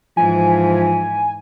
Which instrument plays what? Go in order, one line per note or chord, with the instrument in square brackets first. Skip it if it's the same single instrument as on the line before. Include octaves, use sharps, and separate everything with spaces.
[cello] G#2 E3 [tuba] F3 [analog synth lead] G#5